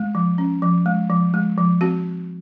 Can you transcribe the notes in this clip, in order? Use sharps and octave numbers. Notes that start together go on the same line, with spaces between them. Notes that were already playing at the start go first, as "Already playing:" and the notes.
Already playing: G#3
F3
C#4
F3
G#3
F3
G#3
F3
C4 F#4